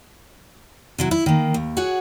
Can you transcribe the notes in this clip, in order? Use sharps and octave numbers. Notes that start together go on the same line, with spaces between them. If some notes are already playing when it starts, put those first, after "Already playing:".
C3 F#3 E4
E4
D#3 A#3
D#2
F#4 G#4 C#5 F#5